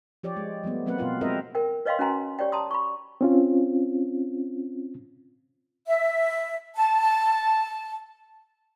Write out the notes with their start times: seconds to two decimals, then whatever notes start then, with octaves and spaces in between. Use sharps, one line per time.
0.23 F3 G4 C#5 D5
0.36 G#3
0.64 F3 G3 A3 B3
0.86 F#3 A#3 C4 B4 F#5
0.98 B2 B3 F4 B4
1.21 G#3 C4 A#4 C5 D#5 E5
1.55 A#4 G5
1.86 B4 C#5 D#5 F5 G5 C6
1.99 C#4 F#4 G#5 A#5 C6
2.39 G4 C#5 D5 G5
2.52 A5 A#5 C6 D#6
2.71 B5 C#6
3.21 C4 C#4 F4
5.87 E5
6.75 A5